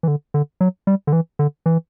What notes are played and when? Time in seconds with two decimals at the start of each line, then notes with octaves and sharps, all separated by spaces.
0.03 E3
0.08 D3
0.34 D3
0.61 F#3
0.87 G3
1.07 D3
1.13 E3
1.39 D3
1.66 E3